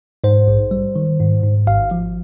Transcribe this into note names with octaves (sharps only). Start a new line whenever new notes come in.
G#2 C5
A#1
G3
D#3
G#2
G#2
G#1 F5
F3